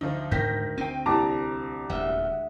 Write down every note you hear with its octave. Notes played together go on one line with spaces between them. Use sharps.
D2 F3 D#4
G#2 D#3 G6 A#6 B6
C4 G5 D#7
C2 A5 A#5 D6
D#1 D2 G#3 E5 F#5